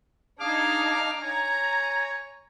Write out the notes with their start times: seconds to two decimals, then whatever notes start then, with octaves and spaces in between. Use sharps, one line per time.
0.40 D4 D#4 G#4 F5 D6 F6
1.22 C#5 G#5 A#5